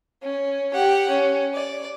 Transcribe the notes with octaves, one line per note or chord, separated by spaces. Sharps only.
C#4
G4 F#5
C#4
D5